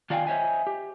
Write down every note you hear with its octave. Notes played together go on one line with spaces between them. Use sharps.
D#3 F4 D5 F5 G5 G#5
C5 C#5 D#5 E5 G#5
G4